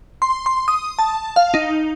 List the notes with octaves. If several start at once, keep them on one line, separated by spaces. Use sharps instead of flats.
C6
C6
D#6
A5
F5
D#4